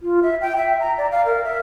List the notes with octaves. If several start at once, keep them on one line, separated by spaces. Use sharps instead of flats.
F4
E5
G5
E5
A#5
D5
F5
A#4
E5